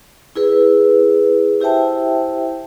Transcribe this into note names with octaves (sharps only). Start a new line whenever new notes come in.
E4 G#4 B4
E4 G4 C5 E5 G5 A5